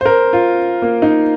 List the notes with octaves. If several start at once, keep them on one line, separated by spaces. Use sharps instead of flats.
C5
A#4
F4
A#3
D#4